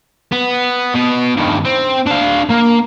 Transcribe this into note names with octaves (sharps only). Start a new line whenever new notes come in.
B3
B2 B3
G2 D#3
C4
D4 F5
A#3